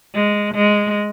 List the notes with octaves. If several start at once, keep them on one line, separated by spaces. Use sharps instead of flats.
G#3
G#3